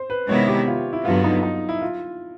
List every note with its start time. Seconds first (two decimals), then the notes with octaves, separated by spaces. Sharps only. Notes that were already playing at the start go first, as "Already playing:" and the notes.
Already playing: C5
0.10 B4
0.28 C3 D#3 G#3 B3 E4 C#5
0.48 G4
0.67 F4
0.93 E4
1.05 G2 D3 F#3 B3 F4
1.24 D#4
1.43 D#4
1.69 E4
1.81 F4